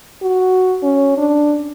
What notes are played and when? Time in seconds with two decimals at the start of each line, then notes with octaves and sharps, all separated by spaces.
0.22 F#4
0.83 C#4
1.18 D4